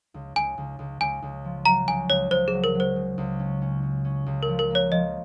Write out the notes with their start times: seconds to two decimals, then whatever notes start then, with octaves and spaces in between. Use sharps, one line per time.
0.14 C#2
0.36 C#2 G#5
0.58 C#2
0.79 C#2
1.01 C#2 G#5
1.22 C#2
1.44 F3
1.65 F#3 A#5
1.88 C#2 G#5
2.09 C#2 C#5
2.31 C#2 C5
2.48 F#3 G#4
2.64 A#4
2.75 F#3
2.80 C5
2.96 C#3
3.18 C#2
3.40 C#4
3.62 C#4
3.83 C#4
4.05 C#4
4.26 C#2
4.43 A#4
4.48 F3
4.59 A#4
4.70 A#3 C#5
4.92 F3 D#5